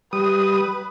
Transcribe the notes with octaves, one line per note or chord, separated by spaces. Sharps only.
G3 B4 D#6